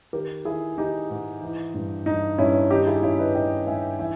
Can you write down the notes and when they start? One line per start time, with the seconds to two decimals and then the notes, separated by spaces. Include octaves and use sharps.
0.13 D#3 G4 A#4
0.45 D#3 E4 G#4
0.77 D#3 D#4 G4
1.10 G#2
1.42 E3
1.74 G2
2.06 G2 D#4
2.38 G2 C#4 E4
2.70 D#3 D#4 G4
2.87 E4 G#4
3.03 G#2 C#4 E4
3.19 B4 D#5
3.35 G#2 D#5 G5
3.67 G#2 E5 G#5
3.99 E3 E5 G#5